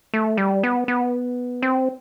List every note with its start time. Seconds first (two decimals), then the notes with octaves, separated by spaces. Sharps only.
0.14 A3
0.37 G3
0.63 B3
0.88 B3
1.62 C4